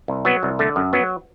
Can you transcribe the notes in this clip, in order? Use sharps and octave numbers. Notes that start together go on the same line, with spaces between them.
C2
F#3 B3
C2
D3 A3
F#2
F#3 B3